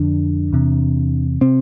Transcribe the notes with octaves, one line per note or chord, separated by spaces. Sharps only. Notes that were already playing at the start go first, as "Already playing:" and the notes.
Already playing: F2 D3 D4
E2 C3
C3 C4